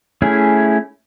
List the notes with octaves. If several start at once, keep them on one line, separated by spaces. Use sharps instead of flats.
A3 C#4 E4 G#4